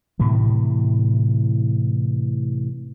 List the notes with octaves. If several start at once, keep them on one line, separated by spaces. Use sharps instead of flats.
A2 C3 E3